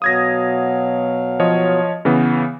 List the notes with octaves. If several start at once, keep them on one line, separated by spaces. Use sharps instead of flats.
B2 F#3 F5 D#6 G#6 A#6
F3 C#5 D#5
C#3 E3 B3